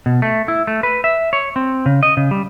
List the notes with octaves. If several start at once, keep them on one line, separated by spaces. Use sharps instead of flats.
B2
A3
E4
A3
B4
E5
C#5
C4
C#3
D#5
C#3
G3